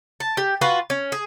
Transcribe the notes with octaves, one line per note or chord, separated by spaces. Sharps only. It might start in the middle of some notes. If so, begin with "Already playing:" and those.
A5
G4
F4 F#4 B4
C#4
G#4